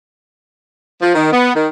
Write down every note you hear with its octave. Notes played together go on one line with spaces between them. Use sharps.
F3
D#3
B3
D#3